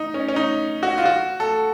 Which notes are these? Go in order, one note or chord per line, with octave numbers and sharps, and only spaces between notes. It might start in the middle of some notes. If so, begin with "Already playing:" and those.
Already playing: D#4
C#4
C#4
D#4
F#4
F4
F#4
A4